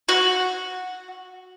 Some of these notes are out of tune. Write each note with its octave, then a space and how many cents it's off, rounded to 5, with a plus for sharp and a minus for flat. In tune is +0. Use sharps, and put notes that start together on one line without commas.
F#4 -10